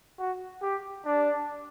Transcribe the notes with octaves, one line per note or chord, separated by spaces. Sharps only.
F#4
G4
D4